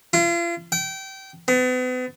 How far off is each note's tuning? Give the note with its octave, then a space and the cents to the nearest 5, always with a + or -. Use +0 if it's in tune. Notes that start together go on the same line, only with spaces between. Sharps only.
F4 -40
G5 -25
B3 +40